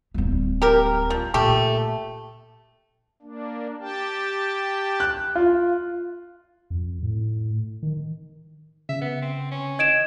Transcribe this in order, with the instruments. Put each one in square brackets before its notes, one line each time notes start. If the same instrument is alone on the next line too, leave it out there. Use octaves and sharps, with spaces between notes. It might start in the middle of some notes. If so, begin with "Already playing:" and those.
[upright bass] D1 G3
[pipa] G4 A#4
F3
[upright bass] A#2 [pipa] A3 G4
[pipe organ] A#3 D4
G4 G5 A5
[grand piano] F#6
F4
[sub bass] F2
A2
D#3
[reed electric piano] C#3 [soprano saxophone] E5
[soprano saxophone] B3
C4
C#4
[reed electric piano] D#5 [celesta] G#6 D7 E7